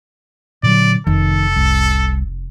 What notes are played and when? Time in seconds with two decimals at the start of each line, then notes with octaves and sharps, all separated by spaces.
0.63 A#2 D3 F#3 D5
1.07 F1 D#3 A4
1.56 C2